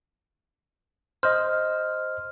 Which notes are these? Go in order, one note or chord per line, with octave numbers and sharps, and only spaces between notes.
C5 D#5 F6